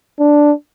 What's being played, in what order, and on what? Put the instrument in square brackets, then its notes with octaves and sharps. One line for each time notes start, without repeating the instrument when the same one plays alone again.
[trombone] D4